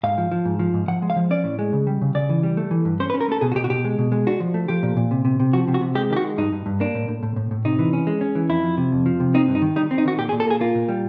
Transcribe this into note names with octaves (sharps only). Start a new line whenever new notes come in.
G#2 F5
F3
F3
G#2
F3
G#2
F3 F#5
G#3
F5
F3
C#4 D5
A2
G#3
C#3
G3
C#3
C#3 D5
E3
G3
A3
E3
G2
C#4 C5
B4
C#4
A#4
A3 A4
B2 G#4
F#4
B2 G4
F#4
B2 G4
G#3
B2
G#3
D4 F#4
F3
A3
F3 G4
A#2
A#2
C3
C3
C3
F3 F#4
C3
F#4
C3
G#3 G4
D#3 G4
F#4
G#3
G2 D#4
G2
G2
A#3 D4
A2
A2
A2
A2
A2
C3 D#4
E3
C#4
G#3
C#4
E3
F2 E4
F3
C3
F2
F3
C3
C4 D#4
G2
D#4
D#3
G3 D#4
C4
D#4
D#3 F#4
A#2 G4
G#4
A#2
A4
A#3 G#4
A#3 F4
A#2
G3